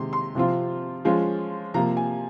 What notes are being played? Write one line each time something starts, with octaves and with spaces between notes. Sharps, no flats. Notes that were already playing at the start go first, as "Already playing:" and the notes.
Already playing: C3 D#3 G#3 D#4 C6
C6
C3 F3 C4 F4
F3 G#3 C#4 F4
C3 F3 A#3 A#5
G#5